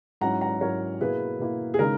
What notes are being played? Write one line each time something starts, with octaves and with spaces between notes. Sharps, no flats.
G#2 F#3 C#4 E4 F#5 A#5
F#5 A#5
G#2 F#3 C#4 E4 A#4 C#5
B2 A#3 E4 G#4 B4
B2 A#3 E4
G#4
C#3 G#3 D#4 A#4